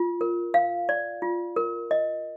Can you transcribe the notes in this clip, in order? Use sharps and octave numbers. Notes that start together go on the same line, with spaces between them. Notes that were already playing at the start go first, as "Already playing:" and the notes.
Already playing: F4
A#4
F5
D5
F4
A#4
D#5